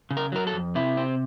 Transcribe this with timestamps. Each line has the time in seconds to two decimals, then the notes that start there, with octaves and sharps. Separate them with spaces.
0.11 C#3
0.17 A#4
0.32 F#3 A#4
0.47 A4
0.53 F2
0.75 C3 E4
0.97 C4